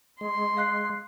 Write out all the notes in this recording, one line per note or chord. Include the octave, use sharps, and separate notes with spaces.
G#3 C6
F5 F#6 C7